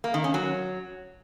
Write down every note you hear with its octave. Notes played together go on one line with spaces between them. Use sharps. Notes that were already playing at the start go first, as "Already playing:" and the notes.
A#3
D#3
C#4
F#3